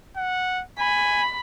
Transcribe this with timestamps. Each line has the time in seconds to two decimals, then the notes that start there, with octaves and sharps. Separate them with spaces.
0.16 F#5
0.79 G#5 B5